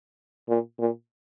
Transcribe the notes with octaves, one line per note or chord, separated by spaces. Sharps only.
A#2
A#2